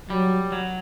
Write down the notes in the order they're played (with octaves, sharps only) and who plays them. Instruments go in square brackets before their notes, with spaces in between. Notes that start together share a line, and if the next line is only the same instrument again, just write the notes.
[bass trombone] F#3 [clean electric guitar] G3
[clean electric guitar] F#3